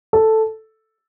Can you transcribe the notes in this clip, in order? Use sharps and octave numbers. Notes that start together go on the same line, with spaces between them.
A4